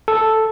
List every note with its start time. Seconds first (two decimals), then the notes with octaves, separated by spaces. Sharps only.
0.08 A4